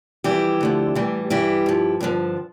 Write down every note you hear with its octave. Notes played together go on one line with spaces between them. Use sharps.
F2 E3 G3 E4 G4
D2 D3 F3
A2 E3 G3
G2 E3 G3 E4 G4
G2 F3
G2 D3 F3